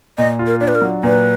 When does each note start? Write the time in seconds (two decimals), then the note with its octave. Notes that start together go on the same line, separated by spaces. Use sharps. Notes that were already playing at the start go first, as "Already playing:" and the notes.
0.18 A#2 D#5
0.39 F4
0.47 A#4
0.60 D4 D5
0.68 B4
0.75 A#4
0.82 F#3
1.03 A#2 B4